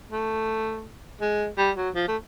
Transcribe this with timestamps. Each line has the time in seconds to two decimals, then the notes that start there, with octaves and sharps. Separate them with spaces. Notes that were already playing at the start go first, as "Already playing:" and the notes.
0.11 A3
1.21 G#3
1.58 G3
1.77 F#3
1.95 F3
2.08 A3